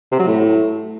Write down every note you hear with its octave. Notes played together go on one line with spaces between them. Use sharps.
C3
F#3
A2